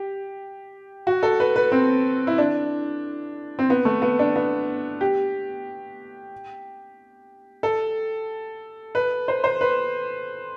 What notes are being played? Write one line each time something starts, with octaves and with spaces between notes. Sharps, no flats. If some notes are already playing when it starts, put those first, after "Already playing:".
Already playing: G4
F#4
A4
B4
B4
C4
E4
D4
C4
B3
A3
B3
D4
B3
G4
A4
B4
C5
C5
B4